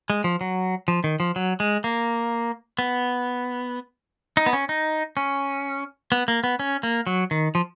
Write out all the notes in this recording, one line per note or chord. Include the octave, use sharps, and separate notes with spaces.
G#3
F3
F#3
F3
D#3
F3
F#3
G#3
A#3
B3
D#4
B3
C#4
D#4
C#4
B3
A#3
B3
C#4
A#3
F#3
D#3
F3